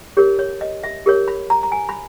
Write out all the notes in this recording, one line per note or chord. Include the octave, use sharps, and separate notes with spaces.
G4 A#4 C#5
C#5
D#5
E5
G4 A#4 C#5
B5
A#5
A#5
G#5
B5